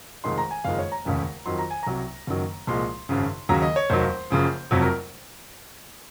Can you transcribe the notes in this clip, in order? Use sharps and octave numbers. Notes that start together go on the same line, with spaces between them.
F1 F2 D#3 G#3 C6
A#5
G#5
F#1 F2 D#3 G#3 F5
C#5
A#5
F1 D#2 C#3 G#3
F2 D#3 F#3 C6
A#5
G#5
C2 C3 F#3 A#5
F#1 F#2 D#3 F#3
C2 A#2 F3 G#3 C6
G#1 F#2 C#3
D#2 C#3 F#3 A#5
D#5
C#5
F1 D#2 D#3 F#3 C5
F#1 F#2 C#3 F3
F1 F2 C3 F#3
A#4